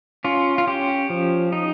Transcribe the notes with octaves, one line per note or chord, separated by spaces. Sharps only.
C#4 F4
F4
C#4 G4
F3
D#4